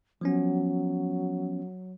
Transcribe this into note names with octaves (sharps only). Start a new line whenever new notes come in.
F3 F#3 B3 C#4